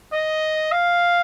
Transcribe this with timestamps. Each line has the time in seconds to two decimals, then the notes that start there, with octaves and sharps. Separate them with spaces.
0.13 D#5
0.72 F5